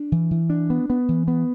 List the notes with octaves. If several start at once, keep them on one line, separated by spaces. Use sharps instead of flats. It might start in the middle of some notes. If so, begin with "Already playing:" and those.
Already playing: D4
E3
E3
D4
B3
B3
E3
B3